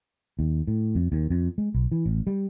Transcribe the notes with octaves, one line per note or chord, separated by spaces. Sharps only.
D#2
A2
F2
D#2
F2
G#3
B1
E3
A1
G3